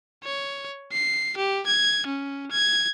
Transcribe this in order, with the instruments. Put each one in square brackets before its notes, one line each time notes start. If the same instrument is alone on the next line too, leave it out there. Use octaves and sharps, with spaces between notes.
[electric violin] C#5
C7
G4
G#6
C#4
G#6